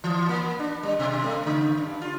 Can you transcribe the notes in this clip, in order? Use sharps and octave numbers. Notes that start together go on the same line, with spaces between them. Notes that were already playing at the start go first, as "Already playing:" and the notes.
E3
A#3
D4
G3
B2
A3
C#3
G2
F4